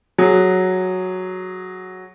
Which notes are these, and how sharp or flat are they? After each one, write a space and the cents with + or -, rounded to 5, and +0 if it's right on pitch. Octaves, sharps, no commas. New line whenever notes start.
F#3 +0 G#4 +0